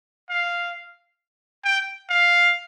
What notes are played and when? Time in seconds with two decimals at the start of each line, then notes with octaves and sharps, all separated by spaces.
0.30 F5
1.64 G5
2.10 F5